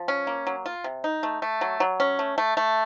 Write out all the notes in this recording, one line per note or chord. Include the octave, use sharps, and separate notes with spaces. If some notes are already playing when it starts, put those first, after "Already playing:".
Already playing: F3
C#4
A#3
F#3
F4
C3
D#4
A3
A3
F#3
F#3
C#4
A3
A3
A3